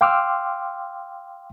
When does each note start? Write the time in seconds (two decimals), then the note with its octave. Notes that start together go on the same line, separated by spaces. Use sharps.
0.01 F5 G5 C6 D6 E6 F6